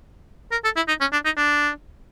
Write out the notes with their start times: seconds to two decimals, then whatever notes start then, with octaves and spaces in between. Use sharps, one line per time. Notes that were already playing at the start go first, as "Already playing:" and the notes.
0.52 A#4
0.64 A4
0.76 E4
0.88 D#4
1.01 C#4
1.13 D4
1.25 D#4
1.37 D4